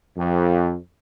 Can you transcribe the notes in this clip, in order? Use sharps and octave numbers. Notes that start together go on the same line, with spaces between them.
F2